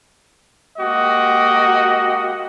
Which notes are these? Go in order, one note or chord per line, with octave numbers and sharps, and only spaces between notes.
G#3 A#3 F#4 G4 D#5